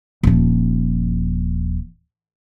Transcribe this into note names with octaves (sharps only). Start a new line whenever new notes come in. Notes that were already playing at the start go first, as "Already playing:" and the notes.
D#1 F3